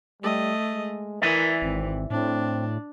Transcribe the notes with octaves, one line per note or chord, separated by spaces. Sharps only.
G3 A3 D#5
G#3
E3 A#4 D5 E5 G#5
G#1 C4
A2 C4 D4